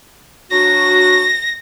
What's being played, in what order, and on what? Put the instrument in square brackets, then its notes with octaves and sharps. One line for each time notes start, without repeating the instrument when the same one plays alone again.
[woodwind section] F#3 D4 F#4 [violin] A#6